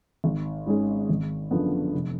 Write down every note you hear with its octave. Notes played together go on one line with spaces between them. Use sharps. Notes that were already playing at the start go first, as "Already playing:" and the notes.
G#1
G#2 G#3 C#4 G#4
G#1
F#2 D3 F3 B3
F1